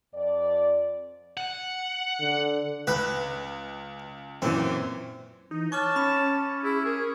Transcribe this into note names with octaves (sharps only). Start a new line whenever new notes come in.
F2 D5
F#5
D3
C#2 B4 F#6
F#2 A#2 E3 C4
E3 D#4
C#5 A5 C#6 D6 F6 F#6
C#4 B5 E7
E4 G#4
G#4 A#4